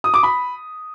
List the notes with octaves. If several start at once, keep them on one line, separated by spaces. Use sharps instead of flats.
D#6
D6
B5